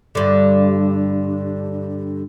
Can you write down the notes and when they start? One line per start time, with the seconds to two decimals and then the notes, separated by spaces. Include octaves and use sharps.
0.15 G2 D3